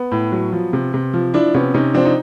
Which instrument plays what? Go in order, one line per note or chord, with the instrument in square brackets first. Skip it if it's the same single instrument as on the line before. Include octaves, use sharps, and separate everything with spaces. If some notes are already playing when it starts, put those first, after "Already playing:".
Already playing: [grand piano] B3
A2
F#3
F3
C3
C3
F3
F3 D4 E4
C3 B3 C#4
C3 C#4 D#4
F3 C4 D4
D#4